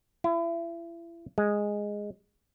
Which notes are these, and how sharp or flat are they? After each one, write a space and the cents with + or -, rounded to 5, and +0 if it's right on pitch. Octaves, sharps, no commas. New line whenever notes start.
E4 +35
G#3 -5